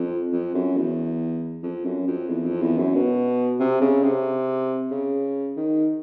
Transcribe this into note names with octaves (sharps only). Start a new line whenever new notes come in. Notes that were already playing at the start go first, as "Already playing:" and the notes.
Already playing: F2
F2
F#2
E2
F2
F#2
F2
E2
F2
E2
F#2
B2
C3
C#3
C3
C#3
D#3